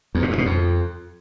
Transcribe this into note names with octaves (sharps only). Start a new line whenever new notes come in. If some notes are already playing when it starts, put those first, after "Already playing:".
E2
A#2
G2
B2
F2